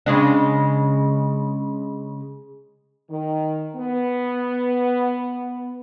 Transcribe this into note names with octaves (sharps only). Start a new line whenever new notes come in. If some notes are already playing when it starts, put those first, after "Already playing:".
C#3 G#3 D4
D#3
B3